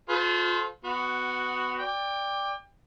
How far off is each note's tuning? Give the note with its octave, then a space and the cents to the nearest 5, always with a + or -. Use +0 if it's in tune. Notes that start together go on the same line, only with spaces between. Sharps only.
F4 +30 A4 -30 C5 -30
B3 +15 F#4 +0
D5 +0 G5 +25